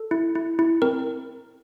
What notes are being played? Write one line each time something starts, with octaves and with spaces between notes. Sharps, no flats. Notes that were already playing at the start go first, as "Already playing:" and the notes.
Already playing: A4
E4
E4
E4
C4 A#4